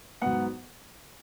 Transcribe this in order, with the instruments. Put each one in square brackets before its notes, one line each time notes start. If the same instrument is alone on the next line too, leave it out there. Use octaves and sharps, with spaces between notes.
[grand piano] G#2 F#3 B3 F#5